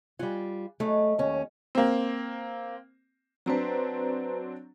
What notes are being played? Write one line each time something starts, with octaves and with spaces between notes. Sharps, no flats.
G3 F4 F#5 G#5
F#3 G#3 A3 D#4
D#2 C#4
A#3 C4
F#3 C4 D4 B4 C5 A#5